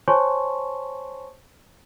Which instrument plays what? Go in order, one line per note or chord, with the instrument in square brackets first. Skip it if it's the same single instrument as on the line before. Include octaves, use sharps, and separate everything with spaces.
[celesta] C5 C#5 G#5 A5 C6 C#6